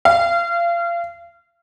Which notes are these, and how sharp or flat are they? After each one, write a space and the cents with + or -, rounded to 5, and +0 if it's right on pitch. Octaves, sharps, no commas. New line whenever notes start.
F5 -30